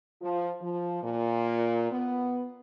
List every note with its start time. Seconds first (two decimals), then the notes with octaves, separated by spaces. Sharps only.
0.21 F3
0.61 F3
1.03 A#2
1.92 B3